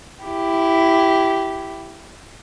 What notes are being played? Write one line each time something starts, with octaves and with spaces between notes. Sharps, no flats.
E4 G4